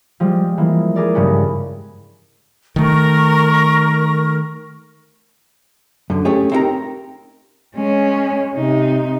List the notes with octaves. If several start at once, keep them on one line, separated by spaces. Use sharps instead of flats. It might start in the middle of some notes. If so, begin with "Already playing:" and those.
F3 G3 G#3
E3 G#3 A#3
G#4 A#4 D5
G2 C#3 G#3 B3 C#4
D#3 A3 A#4 C#6
F#2 D3
A3 C#4 G4 G#4
C4 D#4 E4 G4 A#4 A#5
G#3 C#4
C3 D#4